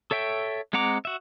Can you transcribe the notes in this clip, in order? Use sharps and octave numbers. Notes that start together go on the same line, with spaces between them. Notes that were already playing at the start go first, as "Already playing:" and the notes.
A4 C#5 E5 G5
G#3 C4 F#5 A#5 D6
F#4 E5